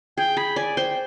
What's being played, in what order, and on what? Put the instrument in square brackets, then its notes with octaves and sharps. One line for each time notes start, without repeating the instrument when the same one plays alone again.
[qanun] G#4 [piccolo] G5
[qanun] G#4 [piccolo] B5
[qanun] D5 [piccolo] G#5
[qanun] C5 [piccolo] G5